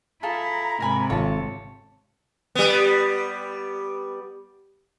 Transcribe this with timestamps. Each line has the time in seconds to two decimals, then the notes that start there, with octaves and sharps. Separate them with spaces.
0.23 E4 F4 G#4 A4 A#5
0.80 G#2 C3 A#4 G#5 B5
1.10 G#1 F4 A4 C#5 A5
2.55 G3 B3